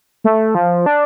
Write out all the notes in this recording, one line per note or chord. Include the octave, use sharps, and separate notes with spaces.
A3
F3
D4